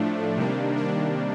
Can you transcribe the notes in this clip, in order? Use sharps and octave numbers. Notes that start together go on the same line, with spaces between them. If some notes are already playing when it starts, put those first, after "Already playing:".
Already playing: A2 F3 A3 D4
C3 D#3 G3 A#3
D4